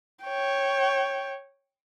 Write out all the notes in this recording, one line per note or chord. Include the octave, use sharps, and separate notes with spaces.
C#5 G5